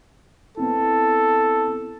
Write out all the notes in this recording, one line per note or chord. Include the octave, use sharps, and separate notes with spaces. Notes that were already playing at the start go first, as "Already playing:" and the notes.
B3 C4 E4 A4